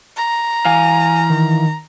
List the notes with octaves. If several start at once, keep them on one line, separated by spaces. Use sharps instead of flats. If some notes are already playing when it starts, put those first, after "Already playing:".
A#5
E3 F5 G#5
D#3